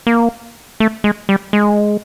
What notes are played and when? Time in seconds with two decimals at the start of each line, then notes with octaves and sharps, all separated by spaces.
0.07 A#3
0.80 A3
1.04 G#3
1.29 G3
1.53 G#3